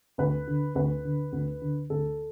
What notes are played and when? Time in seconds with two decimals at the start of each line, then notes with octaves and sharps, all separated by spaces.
0.18 D2 B4
0.47 D3
0.75 D2 B4
1.05 D3
1.32 D2
1.62 D3
1.90 D2 A4